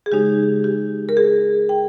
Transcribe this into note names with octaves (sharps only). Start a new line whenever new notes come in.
G#4
C#3 G#3 D#4 G4
G4
A#4
G#4
G5